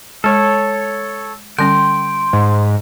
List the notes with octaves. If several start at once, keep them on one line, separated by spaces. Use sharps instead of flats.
G#3 A4 C#5
D3 G3 C#4 G5 C6
G#2